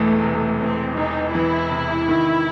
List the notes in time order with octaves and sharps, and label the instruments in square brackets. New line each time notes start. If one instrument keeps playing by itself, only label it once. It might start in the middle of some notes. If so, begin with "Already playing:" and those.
Already playing: [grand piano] E1 E2 E3 [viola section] A3
[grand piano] C3
[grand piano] E2 [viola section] C4
[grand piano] E1 [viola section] D#4
[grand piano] E3 [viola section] E4
[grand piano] C3
D#3